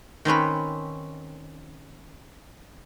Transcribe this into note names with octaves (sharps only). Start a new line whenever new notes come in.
D#3 C4 C#4 B4